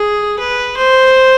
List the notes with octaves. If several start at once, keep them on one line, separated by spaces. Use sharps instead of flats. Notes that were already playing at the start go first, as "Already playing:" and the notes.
Already playing: G#4
B4
C5